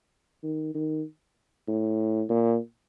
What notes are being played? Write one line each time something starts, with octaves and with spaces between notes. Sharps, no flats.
D#3
D#3
A2
A#2